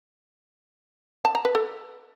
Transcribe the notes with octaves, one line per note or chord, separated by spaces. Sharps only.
A5
A#5
B4
A4